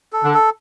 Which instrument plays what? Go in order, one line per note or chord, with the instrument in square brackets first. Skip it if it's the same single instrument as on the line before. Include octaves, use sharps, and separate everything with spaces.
[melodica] A4
[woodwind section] D3 D4
[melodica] A4